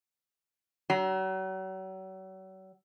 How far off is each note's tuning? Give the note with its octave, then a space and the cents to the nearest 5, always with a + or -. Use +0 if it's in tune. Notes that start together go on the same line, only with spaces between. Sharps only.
F#3 +40